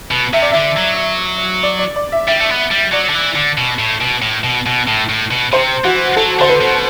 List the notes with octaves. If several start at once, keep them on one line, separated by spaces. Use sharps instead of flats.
B2
C3 E5
D5
D3 E5
F#3
D5
D5
D5
E5
G3 E5
A3
B3
G3
F#3 D5
D3
E3
D3
B2
A2
B2
A2
B2
B2
A2
A2
B2
C3 C5
E3 F#4
F#3 A4
D3 C5
B4
B2